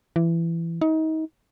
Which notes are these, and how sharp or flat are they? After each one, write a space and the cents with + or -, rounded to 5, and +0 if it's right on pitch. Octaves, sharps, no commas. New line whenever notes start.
E3 +20
D#4 +30